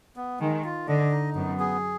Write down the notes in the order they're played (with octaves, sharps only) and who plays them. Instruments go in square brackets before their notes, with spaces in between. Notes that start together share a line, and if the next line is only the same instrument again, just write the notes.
[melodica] B3
[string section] D#3 [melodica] G#3
[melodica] F4
[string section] D3 [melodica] D#5
[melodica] D#4
[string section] F#2 [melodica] B3
[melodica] G#4